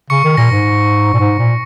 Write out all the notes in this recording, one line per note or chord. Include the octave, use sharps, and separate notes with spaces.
C#3 C#6 C#7
D#3
A#2 A#6
G#2
A#2
G#2
A#2